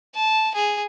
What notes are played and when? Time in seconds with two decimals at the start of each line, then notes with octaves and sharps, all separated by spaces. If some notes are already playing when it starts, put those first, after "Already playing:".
0.15 A5
0.55 G#4